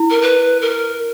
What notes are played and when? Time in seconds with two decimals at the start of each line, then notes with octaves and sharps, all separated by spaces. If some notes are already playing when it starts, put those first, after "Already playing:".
Already playing: E4
0.10 A#4
0.21 B4
0.61 A#4